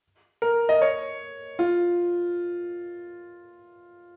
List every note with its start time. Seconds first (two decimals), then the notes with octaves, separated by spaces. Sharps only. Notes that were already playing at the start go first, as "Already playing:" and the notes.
0.42 A#4
0.69 D#5
0.82 C#5
1.59 F4